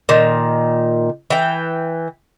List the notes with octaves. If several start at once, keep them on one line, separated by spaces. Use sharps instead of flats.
A#2 D#3
E3 G5